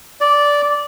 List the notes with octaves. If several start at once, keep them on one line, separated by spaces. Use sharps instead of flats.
D5